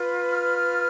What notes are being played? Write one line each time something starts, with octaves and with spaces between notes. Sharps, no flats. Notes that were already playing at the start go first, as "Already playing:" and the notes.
Already playing: F4 B4
F6